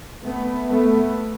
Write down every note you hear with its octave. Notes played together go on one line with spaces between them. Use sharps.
A3 B3
A3 B3